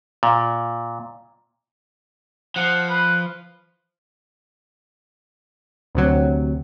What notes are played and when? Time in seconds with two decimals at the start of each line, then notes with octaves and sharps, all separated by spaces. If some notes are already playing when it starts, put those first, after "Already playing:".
0.23 A#2
2.56 F3 F#5
2.90 B4
5.95 D2 C3 F#3